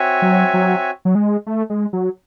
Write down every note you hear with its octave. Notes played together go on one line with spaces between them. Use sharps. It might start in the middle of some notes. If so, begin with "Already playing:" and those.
Already playing: C4 F#4 C#5 E5 G#5
F#3
F#3
F#3
G#3
A3
G#3
F#3